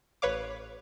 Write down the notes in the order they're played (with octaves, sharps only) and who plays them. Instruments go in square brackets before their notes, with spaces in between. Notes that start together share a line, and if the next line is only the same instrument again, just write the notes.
[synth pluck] A1 B4 C#5 F5 D6